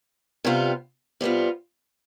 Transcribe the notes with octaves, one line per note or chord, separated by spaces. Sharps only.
C3 G3 B3 F4
C3 G3 B3 F4